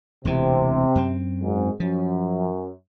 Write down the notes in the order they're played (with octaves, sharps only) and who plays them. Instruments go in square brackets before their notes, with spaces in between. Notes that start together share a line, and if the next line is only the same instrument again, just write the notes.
[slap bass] E1 D2 E3 [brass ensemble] C3
[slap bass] F#2 C4
[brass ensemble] G#1 G#2 G#4
[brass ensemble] F#2 [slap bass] F3